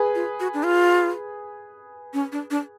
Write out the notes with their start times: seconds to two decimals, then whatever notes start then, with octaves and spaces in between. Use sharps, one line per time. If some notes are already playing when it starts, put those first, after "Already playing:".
Already playing: G#4 B4
0.15 F4
0.40 F#4
0.54 D4
0.65 F4
2.13 C#4
2.32 D4
2.51 D4